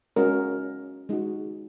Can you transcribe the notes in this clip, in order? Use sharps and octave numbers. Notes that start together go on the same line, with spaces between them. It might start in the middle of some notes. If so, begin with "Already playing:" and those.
G#3 C#4 F#4 A#4 D#5
G#3 D#4 F#4